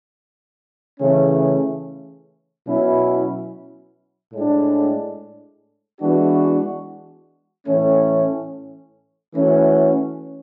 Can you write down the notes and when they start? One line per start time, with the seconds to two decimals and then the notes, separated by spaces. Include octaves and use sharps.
1.00 C#3 E3 A3 C#4
2.66 B2 F#3 C#4 E4
4.33 A2 G#3 D4
6.00 E3 G#3 B3 D4 F#4
7.67 A2 E3 A3 C#4
9.33 E3 A3 C#4 F#4